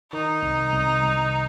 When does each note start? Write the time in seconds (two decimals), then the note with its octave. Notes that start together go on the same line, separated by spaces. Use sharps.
0.12 D#3 D#4
0.42 C2
0.72 C2
1.03 C2